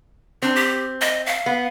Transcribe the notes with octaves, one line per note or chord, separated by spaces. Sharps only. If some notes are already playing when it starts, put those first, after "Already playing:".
C4 D4
G4
D#5
F5
B3